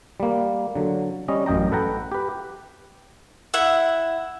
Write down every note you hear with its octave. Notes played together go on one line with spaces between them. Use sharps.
G3 A#3
D3 F#3
G3 C#4 D#5
A1 F#2 D#5 G5 A#5
A4 B4 F#5 G5 A#5
G4 B4
E4 E5 F#5